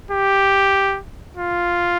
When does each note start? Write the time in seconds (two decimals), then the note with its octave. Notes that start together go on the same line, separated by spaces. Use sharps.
0.11 G4
1.37 F4